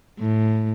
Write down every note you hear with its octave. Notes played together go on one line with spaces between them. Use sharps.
A2